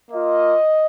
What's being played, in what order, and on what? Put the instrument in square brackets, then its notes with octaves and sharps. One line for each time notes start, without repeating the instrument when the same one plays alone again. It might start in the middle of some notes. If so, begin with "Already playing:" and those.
[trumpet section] A#3 F4 D#5